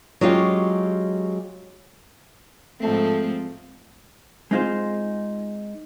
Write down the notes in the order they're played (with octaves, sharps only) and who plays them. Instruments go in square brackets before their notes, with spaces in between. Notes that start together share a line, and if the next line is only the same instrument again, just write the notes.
[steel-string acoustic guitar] F#3 G#3 C#4 F4 G4 C#5
[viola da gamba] G#2 F3 C4 [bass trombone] A3
[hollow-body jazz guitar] G#3 C4 D#4 F4 G#4 C5